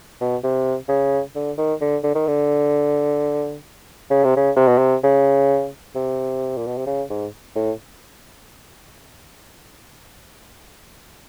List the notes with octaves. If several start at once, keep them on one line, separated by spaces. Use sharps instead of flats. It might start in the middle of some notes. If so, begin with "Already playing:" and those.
B2
C3
C#3
D3
D#3
D3
D3
D#3
D3
C#3
C3
C#3
C3
B2
C3
C#3
C3
A#2
B2
C3
C#3
G#2
A2